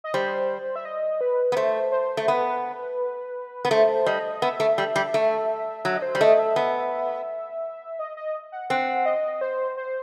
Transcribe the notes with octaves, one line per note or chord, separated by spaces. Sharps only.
D#5
G3 C5
E5
D#5
B4
B3
A3 C5
C5
A3
B3 B4
B3
A3 C5
G3 D#5
B3 E5
A3
G3
G3
A3
F#3 E5
D#5
C5
G3
A3 D#5
E5
B3
D#5
D#5
F#5
C4 F#5
D#5
C5
C5